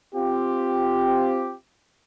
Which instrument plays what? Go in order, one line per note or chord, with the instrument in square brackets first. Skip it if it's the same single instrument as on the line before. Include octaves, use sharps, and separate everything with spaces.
[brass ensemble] C4 F4 G4